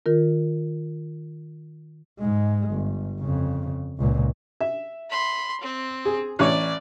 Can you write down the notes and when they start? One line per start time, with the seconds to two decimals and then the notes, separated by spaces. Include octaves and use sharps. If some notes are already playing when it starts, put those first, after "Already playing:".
0.06 D#3 F4 A#4
2.19 G#2 G#3
2.72 G1
3.20 F2 C#3
3.99 C#2 A#2
4.61 E5
5.11 B5 C6
5.61 C4
6.05 G#4
6.39 A1 C#5 D5 C#6